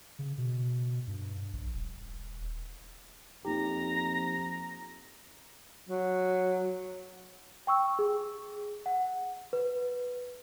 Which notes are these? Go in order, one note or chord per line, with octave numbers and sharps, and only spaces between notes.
C#3
B2
G2
A#1
D#1
F2 A#3 D#4 G4 A#5
F#3
G5 C#6 E6
G#4
F#5
B4